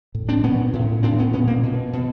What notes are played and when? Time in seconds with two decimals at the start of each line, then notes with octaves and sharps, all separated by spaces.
0.15 A2
0.29 C4 D4
0.43 A#2 B3 C#4
0.73 A2
1.03 A2 C4 D4
1.18 B3 C#4
1.33 A#2 B3 C#4
1.48 A#3 C4
1.63 B2
1.93 B2